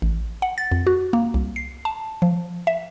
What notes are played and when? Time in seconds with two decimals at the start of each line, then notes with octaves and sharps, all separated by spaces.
0.02 A1
0.42 F#5
0.58 A6
0.72 F2
0.87 F#4
1.13 A#3
1.34 C2
1.56 C7
1.85 A5
2.22 F3
2.67 E5